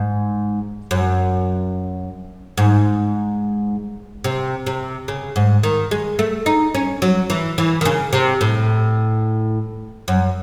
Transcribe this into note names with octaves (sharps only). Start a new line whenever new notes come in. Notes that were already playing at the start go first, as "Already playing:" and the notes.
Already playing: G#2
F#2
G#2
C3
C3
C#3
G#2
D#3
G#3
A3
D#4
C#4
F#3
E3
E3
D#3
C#3
C3
A2
F#2